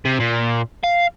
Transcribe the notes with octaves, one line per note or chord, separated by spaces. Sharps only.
C3
A#2
F5